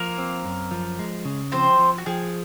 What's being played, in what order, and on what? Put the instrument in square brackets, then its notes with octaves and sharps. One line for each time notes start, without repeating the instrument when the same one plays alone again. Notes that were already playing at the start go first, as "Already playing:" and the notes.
Already playing: [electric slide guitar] F3 [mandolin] A#3 A#4
[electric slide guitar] C4
F#2
F3
G#3
C#3
[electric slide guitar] F3 [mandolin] C4 C5
[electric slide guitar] F3
[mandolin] F#4
[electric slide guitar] F3 [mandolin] G#4